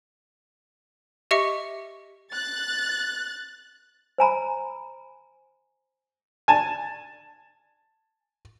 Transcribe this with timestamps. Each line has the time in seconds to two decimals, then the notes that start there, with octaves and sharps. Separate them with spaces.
1.31 G4 D#5 E5 C#6 C#7
2.33 F#6 A6
4.18 C5 G#5 A#5 B5
6.48 G#5 A5